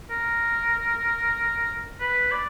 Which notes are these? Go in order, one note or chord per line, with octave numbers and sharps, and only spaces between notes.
A#4
B4
D5